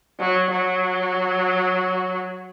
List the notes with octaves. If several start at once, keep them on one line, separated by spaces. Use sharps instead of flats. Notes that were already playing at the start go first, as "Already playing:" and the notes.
F#3
F#3